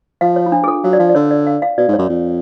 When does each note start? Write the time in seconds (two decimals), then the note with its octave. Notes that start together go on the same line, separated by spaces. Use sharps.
0.21 F3 F5
0.36 C#5
0.46 F4
0.52 D4
0.64 G#4
0.68 A4
0.84 F#3 F5
0.93 D5
0.99 F3 F5
1.09 D5
1.15 D3 C#5
1.31 D5
1.47 F5
1.62 F5
1.78 B2 D5
1.88 G#2
1.94 F#2 C#5
2.09 F2